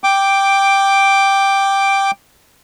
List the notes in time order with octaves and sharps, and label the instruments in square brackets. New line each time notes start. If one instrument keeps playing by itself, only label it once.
[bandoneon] G5 D6